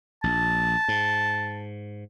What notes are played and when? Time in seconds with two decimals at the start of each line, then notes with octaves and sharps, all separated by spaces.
0.24 A#1 A5
0.88 G#2